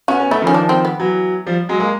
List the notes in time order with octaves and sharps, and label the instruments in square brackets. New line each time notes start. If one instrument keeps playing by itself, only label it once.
[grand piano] B3 C#4 [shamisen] F#4
[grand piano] B3 C#4
[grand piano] A3 B3 [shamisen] E4
[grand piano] D#3 F3 [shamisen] C#4
[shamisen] D4
C4
B3
[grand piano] E3 F#3
F3 G3
F#3 G#3
G#3 A#3